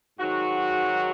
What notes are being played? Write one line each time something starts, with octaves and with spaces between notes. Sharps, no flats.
G#2 D#3 F#3 F#4